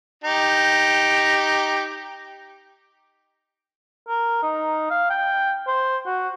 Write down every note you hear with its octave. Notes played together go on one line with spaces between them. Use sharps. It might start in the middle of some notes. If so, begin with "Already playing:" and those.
D#4 G4
A#4
D#4
F5
G5
C5
F#4